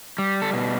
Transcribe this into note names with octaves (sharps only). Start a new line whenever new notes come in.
G3
A4
B2